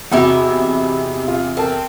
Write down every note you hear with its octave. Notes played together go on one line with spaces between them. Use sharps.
E2 C3 D#4 E4 F#4 G4 F#5 B5
F4
C4 A4 A#4 A5